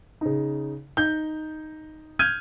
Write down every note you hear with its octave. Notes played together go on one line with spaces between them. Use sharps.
C#3 D#4
D#4 G6 G7
F6 G6 G#6 D#7